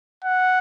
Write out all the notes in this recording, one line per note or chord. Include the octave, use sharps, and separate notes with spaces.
F#5